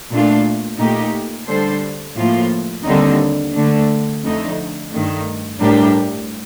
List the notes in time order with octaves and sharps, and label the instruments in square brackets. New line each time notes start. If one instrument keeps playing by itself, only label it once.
[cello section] A#2 A3 D4 F4
A#2 A3 D#4 G4
D3 G3 D4 A4 C5
A2 F3 A#3 F4
D#2 D3 G3 C4 D#4
D3 A3 D4
F2 D3 A3 D#4
G2 D#3 A3
A2 G3 D4 G4 A#4